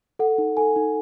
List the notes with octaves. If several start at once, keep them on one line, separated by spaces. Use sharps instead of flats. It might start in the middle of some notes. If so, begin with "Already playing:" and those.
A4 F#5
D#4
A4 G#5
D#4